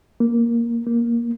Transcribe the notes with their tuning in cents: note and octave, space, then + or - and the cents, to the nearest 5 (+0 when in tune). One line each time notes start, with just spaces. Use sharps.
A#3 +5
A#3 +10